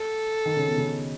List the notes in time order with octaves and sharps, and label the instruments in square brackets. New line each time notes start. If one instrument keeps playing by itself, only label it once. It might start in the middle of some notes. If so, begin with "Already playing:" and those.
Already playing: [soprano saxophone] A4
[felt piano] D#3
C#3
B2
C#3